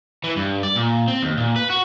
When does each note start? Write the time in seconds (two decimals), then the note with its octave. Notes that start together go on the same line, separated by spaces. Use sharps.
0.24 E3
0.36 G2
0.63 D5
0.76 A#2
1.08 C4
1.23 D#2
1.37 A#2
1.56 B4
1.70 F#4